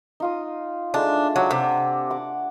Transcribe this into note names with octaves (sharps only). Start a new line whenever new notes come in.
D#4 F4 D#6
G#3 A3 D4 D#4
F#3 D4 F#5
C3
F#5 D6